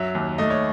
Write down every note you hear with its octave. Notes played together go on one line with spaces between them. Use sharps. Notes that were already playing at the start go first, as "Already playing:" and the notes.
Already playing: F#2 F#3 E5
D#2
A3 D#5
C#5